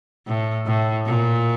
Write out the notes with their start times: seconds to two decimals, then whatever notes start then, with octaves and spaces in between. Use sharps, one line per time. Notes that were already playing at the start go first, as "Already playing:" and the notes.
0.27 A2
0.66 A2
1.06 A#2